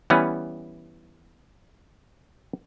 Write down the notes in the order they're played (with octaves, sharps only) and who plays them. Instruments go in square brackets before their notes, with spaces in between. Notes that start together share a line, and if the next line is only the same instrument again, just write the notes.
[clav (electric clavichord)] E3 G3 B3 C#4